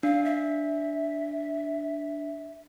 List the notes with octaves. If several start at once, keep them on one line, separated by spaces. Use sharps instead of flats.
D4 F5
E5